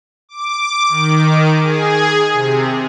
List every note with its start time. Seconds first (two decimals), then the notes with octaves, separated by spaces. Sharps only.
0.29 D6
0.89 D#3
1.62 G#4
2.34 C3